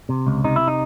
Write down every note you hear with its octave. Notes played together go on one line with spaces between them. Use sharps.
C3
C#2
C3 D#4
E4
D#4